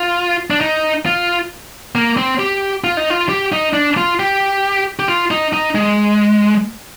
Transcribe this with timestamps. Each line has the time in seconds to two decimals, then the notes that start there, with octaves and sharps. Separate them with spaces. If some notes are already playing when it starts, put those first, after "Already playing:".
Already playing: F4
0.50 D4
0.61 D#4
1.06 F4
1.95 A#3
2.17 C4
2.39 G4
2.84 F4
2.97 D#4
3.10 F4
3.29 G4
3.52 D#4
3.74 D4
3.97 F4
4.19 G4
4.99 G4
5.08 F4
5.31 D#4
5.53 D#4
5.75 G#3